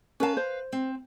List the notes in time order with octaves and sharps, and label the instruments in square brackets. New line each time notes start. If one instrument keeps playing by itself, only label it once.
[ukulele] C#4 A#4 A5 [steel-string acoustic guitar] B4 F5
[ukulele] C5
[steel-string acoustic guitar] C4